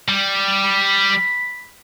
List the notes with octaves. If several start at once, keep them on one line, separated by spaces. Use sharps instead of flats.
G3
B5